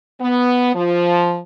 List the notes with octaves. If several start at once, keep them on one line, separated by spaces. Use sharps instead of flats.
B3
F3